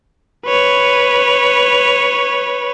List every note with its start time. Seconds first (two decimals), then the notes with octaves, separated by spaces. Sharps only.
0.46 B4 C#5